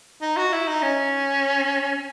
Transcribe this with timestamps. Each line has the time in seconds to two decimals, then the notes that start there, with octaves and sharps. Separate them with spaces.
0.21 D#4
0.37 F#4
0.53 E4
0.68 D#4
0.82 C#4